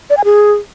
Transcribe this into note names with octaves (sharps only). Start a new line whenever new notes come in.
D5
G#5
G#4